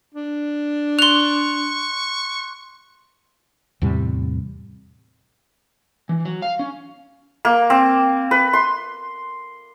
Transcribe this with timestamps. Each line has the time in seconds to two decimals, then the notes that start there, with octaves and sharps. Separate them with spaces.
0.14 D4
0.99 C6 C#6 F#6 F7 G7
3.82 E2 A2 C3 G3
6.09 E3
6.25 F#3
6.42 F5
6.59 C#4
7.45 A#3
7.70 C4
8.31 B4
8.53 C6